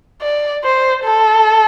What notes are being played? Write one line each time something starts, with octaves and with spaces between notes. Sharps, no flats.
D5
C5
A4